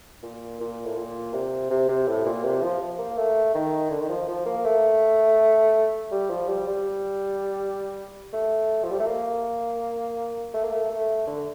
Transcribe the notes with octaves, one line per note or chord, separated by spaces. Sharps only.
A#2
A#2
A2
A#2
C3
C3
C3
A2
A#2
C3
F3
A#3
A3
D#3
D3
D#3
F3
F3
A#3
A3
G3
F3
G3
G3
A3
F3
G3
A3
A#3
A3
A#3
A3
A3
D3